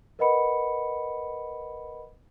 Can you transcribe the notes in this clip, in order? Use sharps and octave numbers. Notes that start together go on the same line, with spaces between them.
A#4 B4 D#5 F#5 B5 C#7